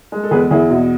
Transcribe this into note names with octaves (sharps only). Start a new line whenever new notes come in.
G#3
A4
E2 G#4 B4
E2 E4 G#4
B2